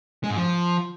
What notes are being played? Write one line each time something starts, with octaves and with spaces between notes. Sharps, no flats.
G#3
G#2
F3